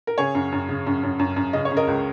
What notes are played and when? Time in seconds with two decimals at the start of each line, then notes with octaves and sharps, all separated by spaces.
0.07 A#4
0.18 C#3 G#4 C#5
0.35 F#2
0.52 F#2
0.69 C#3
0.87 F#2
1.03 F#2
1.19 F#2
1.36 F#2
1.53 C#3 D#5
1.65 C#5
1.71 C#3
1.77 A#4 D#5
1.87 C#2